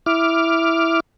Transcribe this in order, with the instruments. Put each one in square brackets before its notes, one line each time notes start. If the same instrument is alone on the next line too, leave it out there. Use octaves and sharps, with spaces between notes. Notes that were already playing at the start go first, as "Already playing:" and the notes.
[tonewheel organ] E4 D6 F6